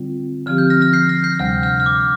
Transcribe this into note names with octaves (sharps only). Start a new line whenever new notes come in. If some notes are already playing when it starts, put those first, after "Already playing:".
Already playing: D3 G3 C4 F4
D3 F3 C4 G4 F6
G6
F6 A#6
F6 A#6
G6 C7
F6 A#6
G6 C7
D2 C3 G3 F6
F6
F6
D6